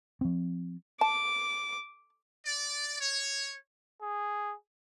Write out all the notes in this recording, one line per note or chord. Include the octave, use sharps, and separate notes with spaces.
F3 C4
A5 D6
D5
C#5
G#4